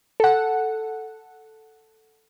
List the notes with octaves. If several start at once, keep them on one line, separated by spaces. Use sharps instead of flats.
A4 F#5